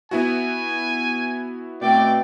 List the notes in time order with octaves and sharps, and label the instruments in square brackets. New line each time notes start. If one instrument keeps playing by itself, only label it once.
[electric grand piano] B3 E4 F#4 [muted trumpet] G#5
[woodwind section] B2 A3 C4 [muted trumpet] D5 [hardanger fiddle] G5 D6